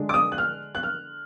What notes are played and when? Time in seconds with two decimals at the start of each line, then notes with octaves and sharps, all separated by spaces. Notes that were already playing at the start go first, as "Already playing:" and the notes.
Already playing: D3 G#3 D4
0.09 D6
0.14 D#6
0.32 F#6
0.38 F6
0.75 F#6
0.83 F6